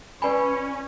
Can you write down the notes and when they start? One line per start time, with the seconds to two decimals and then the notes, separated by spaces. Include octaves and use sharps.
0.22 C#4 B4 D5 G#5 B5